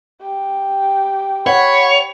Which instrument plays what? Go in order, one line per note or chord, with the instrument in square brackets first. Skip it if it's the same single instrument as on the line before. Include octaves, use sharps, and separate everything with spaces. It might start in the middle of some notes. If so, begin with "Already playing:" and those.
[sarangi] G4
[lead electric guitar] C#5 [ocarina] F#5 [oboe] B5